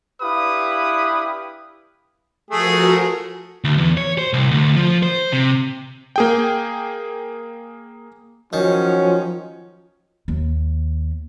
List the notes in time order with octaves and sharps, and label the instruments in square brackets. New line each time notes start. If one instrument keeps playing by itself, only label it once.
[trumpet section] D4 E4 G4 B4 F5 D#6
[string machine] F3 F#4 A#4 [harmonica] A3 G#4
[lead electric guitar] D2
E2
C#5
C5
C2
D2
F3
C5
C3
[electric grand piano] A#3 G#4 G5
[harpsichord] D#3 [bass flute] F3 [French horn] F#3 [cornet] C#4
[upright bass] D#2